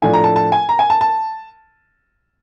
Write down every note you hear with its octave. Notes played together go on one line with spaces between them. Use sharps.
A2 F3 A3 D4 G#5
A#5
A5
A5
G#5
A#5
G#5
A5
A5